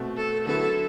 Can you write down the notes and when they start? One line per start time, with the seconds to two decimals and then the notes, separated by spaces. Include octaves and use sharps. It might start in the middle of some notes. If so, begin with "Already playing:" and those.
Already playing: B2 A3 C4 F#4
0.17 A4
0.46 D3 F#3 B3 E4 A4